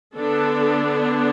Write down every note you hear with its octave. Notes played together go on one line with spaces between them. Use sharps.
D3 B3 D4 A4